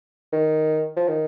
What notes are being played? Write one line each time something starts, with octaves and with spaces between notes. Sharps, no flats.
D#3
F3
D#3